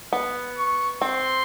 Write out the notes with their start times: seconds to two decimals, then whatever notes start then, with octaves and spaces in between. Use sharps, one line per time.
0.13 B3
0.58 C#6
1.02 C4 C6